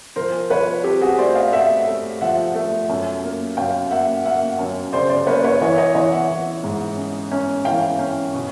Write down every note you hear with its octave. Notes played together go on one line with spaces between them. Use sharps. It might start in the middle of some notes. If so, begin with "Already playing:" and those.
F3 A#4 C5
F3 B4 C#5
C4 G4 A4
F#4 G#4
A3 C5 D5
D#5 F5
A3 E5 F#5
A3
F3 E5 F#5
A3
F#2
A#3
F#2 F5 G5
A#3 E5 F#5
A#3 E5 F#5
F#2
C#3 C5 D5
C5 D5
A#3 B4 C#5
B4 C#5
E3 C#5 D#5
C#5 D#5
E3 C#5 D#5
E5 F#5
E3
G#2
C#4
C#4
E3 F5 G5
C#4
B2